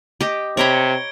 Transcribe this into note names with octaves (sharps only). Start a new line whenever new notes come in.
G4 D#5
C3 C#5 A#5 B5 G#6 D7 G7